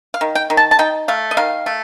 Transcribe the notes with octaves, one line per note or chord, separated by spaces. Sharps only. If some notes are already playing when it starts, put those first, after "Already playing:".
F5
D#3
G5
D#3
A5
A5
D#4 G5
A3 F5
D#5
D#3 F5
A3